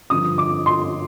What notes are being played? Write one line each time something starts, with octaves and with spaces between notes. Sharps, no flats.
G2 D3 F3 D#6
D6
C6